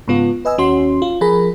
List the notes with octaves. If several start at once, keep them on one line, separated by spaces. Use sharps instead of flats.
G#2 C#3 B3 F4
B4 D#5 G#5 E6
D#2 C#4 F#4 C6
F4
F3 G#4 A#4 B5